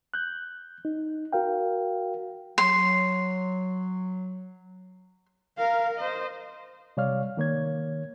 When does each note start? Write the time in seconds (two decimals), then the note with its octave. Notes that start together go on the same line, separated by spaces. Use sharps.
0.14 F#6 G6
0.85 D#4
1.33 F#4 A#4 F5 G5
2.58 F#3 C6
5.57 A#4 F5
5.98 C5 D#5
6.97 C3 G3 C#5 D5 F5 F6
7.37 D#3 A#3 C#5 G#6